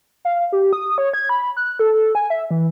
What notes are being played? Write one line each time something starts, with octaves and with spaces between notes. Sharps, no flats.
F5
G4
D#6
C#5
G#6
B5
F#6
A4
G#5
E5
E3